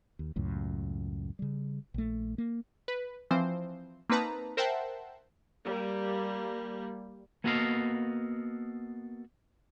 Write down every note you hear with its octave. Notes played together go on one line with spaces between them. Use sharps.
D#2
C#2 F#2 A2
C#3 G3
A#1 A3
A#3
B4
E3 F3 C4 C5
A#3 C4 D#4 B4 A5 A#5
A#4 C5 E5 F#5 G5 A5
G3 A#3
A#3 B3 F#4 A4 D#5 F5